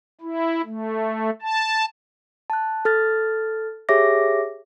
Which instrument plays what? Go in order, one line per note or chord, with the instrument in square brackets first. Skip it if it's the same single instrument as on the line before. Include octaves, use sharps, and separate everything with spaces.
[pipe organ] E4
A3
A5
[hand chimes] A5 F#6
A4 F6 A6
G4 G#4 C#5 E5 D6 A#6